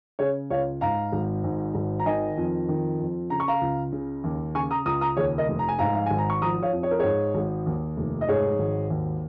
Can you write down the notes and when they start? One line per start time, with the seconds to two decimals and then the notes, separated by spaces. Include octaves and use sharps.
0.19 C#3 G#4 C#5
0.50 C#2 C#5 F5
0.81 G#2 F5 A#5
1.12 G#1
1.44 G#2
1.75 G#1
1.99 A#5
2.06 D#3 D#5 G#5
2.37 F2
2.69 D#3
3.00 F2
3.30 C#3 A#5
3.40 C#6
3.48 F5 A#5
3.61 C#2
3.93 C#3
4.24 D#2
4.55 C#3 G#5 C#6
4.71 A#5 D#6
4.86 C#2 A#5 D#6
5.01 A#5 D#6
5.17 D#2 G#4 C#5
5.38 A#4 D#5
5.48 F1
5.59 A#5
5.68 G#5
5.79 G#2 F5 A#5
5.95 F5
6.06 G#1 G#5
6.18 A#5
6.30 C#6
6.42 F3 A#5 D#6
6.62 C#5 F5
6.73 F2
6.83 C#5
6.91 A#4
6.99 G#2 G#4 C#5
7.35 G#1
7.66 D#2
7.97 F1
8.21 D#5
8.28 G#2 G#4 C#5
8.59 G#1
8.90 D#2